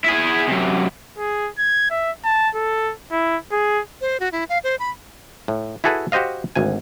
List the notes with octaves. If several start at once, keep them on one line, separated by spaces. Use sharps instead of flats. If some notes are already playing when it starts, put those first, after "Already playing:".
E4 G#4
F#2 C3
G#4
G#6
E5
A5
A4
E4
G#4
C5
F#4
E4
F5
C5
B5
A2
E4 F#4 G#4 A4 B4
F#4 G4 C5 D#5 F5
G#1 D2 G#5